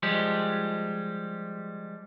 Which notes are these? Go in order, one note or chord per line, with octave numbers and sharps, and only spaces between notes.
F3 G3 G#3 G4